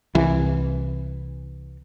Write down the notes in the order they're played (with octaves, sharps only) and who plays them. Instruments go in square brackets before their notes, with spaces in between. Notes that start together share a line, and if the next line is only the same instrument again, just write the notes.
[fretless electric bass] C2 E3